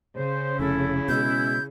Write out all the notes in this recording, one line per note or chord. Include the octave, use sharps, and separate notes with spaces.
C#3 C5
F1 C#4 E4 A4
B2 G#3 G6